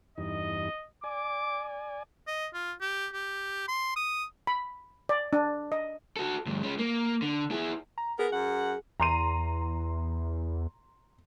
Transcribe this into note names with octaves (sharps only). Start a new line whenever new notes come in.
E2 G2 D#4 D#5
D5 G#5 D6
D#5
F4
G4
G4
C6
D#6
B5
D5
D4
D#5
F#4 A4
D2 G2
G#3 C#4
A#3
D3
E4 G#4
A#5
B3 G#4 A#4
F#2 F#5
E2 A#5 C6 D#7